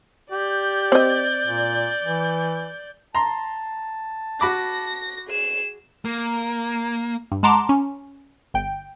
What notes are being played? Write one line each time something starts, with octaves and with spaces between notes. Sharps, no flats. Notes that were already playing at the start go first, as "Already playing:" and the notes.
G4 D5 G6
C4 D#5
A#2
E3
A5 A#5 C6
F#4 B5 D6 A#6
G#4 E7
A#3
G2
G#3 F#5 A5 A#5 C6 D6
C#4
G1 G5